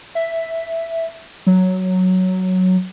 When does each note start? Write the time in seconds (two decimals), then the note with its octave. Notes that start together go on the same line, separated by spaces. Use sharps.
0.15 E5
1.47 F#3